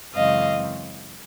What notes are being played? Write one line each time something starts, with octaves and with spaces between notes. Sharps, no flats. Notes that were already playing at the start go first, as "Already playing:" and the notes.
F#2 C#3 E3 G#3 C4 D#5 F5